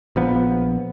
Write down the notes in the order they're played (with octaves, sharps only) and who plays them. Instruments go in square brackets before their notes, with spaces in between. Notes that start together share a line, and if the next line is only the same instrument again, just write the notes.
[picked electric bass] A#1 F3 B3